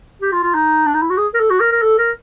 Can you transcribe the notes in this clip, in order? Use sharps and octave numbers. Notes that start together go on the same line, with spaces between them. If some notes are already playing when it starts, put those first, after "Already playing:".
G4
F4
F4
D#4
D4
D#4
E4
F#4
G#4
A#4
A4
F#4
A#4
A#4
A4
A#4